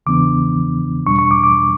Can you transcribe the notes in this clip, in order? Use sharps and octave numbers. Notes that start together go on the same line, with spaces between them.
E2 C#3 E3 B3 D4 D6
E2 B2 G3 D4 C#6
C#6
D6
D6